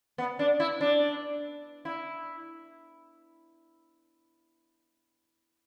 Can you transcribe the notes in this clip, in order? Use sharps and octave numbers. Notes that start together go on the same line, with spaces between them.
B3
D4
E4
D4
E4